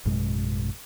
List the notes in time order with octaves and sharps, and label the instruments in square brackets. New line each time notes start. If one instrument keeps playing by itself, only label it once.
[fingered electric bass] A1 F#2 B2 G#3